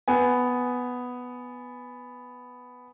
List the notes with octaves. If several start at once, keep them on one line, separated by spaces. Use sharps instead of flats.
B3 G#5